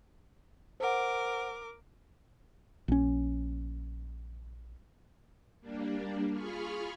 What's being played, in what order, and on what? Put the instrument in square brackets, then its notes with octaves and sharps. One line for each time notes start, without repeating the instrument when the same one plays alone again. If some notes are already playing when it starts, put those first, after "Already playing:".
[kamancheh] A#4 D6 [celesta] C5 F#5
[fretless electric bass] A#1 C#4
[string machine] G3 A#3 D4
F4 G#4 B5 C#6 F6